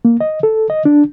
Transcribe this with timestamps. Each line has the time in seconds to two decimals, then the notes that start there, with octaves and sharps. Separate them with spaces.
0.05 A#3
0.21 D#5
0.43 A4
0.70 D#5
0.85 D4